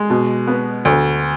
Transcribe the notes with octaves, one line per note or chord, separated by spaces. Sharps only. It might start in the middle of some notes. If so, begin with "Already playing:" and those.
Already playing: G#3
B2
B3
D2